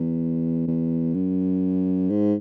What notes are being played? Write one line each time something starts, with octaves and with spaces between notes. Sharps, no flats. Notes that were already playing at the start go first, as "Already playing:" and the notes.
Already playing: E2
E2
F#2
G#2